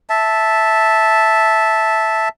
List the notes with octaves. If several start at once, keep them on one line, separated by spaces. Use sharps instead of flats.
E5 A5